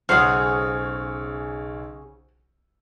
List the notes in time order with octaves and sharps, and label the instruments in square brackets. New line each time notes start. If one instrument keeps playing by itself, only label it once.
[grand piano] B1 C#5 [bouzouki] C#3 G#4 [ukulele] C5 F5 F#5 [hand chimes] F6